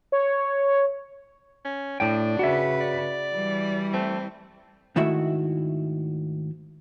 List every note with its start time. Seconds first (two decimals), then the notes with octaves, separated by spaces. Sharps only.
0.12 C#5
1.65 C#4
2.00 A2 D4 G5
2.39 C#3 F#4 B4 E5
2.81 D5
3.33 E3 G3
3.94 A3 C4
4.96 G#2 D#3 A3 E4 F#4 E5